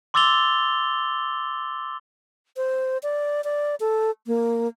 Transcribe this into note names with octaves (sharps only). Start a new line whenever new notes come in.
C6 D6 E6 A6 F7 G7
C5
D5
D5
A4
A#3